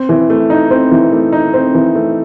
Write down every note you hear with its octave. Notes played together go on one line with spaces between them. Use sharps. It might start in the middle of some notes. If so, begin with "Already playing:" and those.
Already playing: C4
E3
A3
D#4
C4
E3
A3
D#4
C4
E3
A3